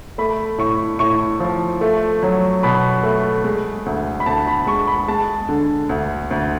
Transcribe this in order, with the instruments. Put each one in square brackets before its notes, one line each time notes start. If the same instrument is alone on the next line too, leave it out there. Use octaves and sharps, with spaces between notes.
[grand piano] A3 B5
A2 C#6
A2 C#6
F3
A3
F#3
B2 B5
A3
G#3
D2
B5
D2 A5
B5
G#3 C#6
B5
G#3 A5
D3
D2
D2